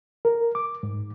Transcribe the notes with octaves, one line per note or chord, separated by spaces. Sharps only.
A#4
D6
G#2